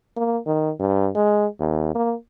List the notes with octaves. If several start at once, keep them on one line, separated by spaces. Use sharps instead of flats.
A#3
D#3
G2
G#3
D#2
A#3